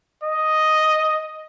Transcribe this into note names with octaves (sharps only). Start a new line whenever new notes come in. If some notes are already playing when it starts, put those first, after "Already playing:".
D#5